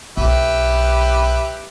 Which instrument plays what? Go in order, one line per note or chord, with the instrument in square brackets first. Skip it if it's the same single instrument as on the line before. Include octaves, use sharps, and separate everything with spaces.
[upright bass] B1 [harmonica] G4 B4 E5